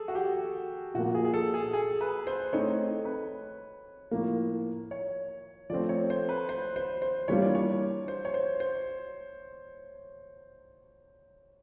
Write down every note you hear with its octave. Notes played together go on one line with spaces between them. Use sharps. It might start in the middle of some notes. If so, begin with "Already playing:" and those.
Already playing: G#4 A4
F#4
G4
A#2 F3 A#3 F#4
G#4
G#4
A4
G#4
G#4
B4
C5
A3 C4 D#4 C#5
B4
A2 F3 A#3
C#5
F3 A3 C4 D5
C#5
C5
B4
C5
C5
C5
E3 G3 A#3 D4 F4 C#5
D5
C#5
C5
C#5
C5
C5